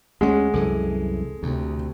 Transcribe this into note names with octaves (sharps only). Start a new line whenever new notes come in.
D2 G#3 C#4 F#5
C2 F#2 E3 A4
D2 C3